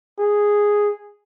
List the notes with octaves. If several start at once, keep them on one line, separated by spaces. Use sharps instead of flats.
G#4